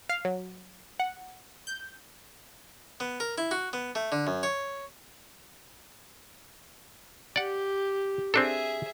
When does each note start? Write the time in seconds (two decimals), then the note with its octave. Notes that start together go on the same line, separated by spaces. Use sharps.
0.09 F5
0.25 F#3
1.00 F#5
1.67 G6
3.00 B3
3.20 A#4
3.38 E4
3.51 F#4
3.73 B3
3.95 A3
4.12 D3
4.27 F#2
4.43 C#5
7.36 G4 D5 F#5
8.34 C4 D4 G#4 A4 E5